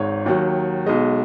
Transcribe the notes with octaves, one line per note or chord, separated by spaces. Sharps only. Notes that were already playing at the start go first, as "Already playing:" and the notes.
Already playing: G#1 G#2 C#5
D#2 D#3 F#3
B1 B2 G#3 D#5